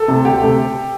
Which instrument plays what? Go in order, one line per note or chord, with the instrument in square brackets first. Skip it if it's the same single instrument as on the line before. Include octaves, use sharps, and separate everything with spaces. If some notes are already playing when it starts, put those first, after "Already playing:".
Already playing: [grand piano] A4
[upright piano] C3 A3
[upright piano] D2 [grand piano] G4
[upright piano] C3 A3